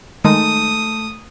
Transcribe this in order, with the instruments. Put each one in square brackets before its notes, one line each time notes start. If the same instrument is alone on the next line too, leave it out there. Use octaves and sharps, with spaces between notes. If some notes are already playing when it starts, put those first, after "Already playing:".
[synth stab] D#3 G#3 D#4 [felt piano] A3 [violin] D#6